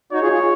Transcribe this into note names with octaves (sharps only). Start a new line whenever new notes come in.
D#4 F#4 C#5
F4 G#4
F4 G#4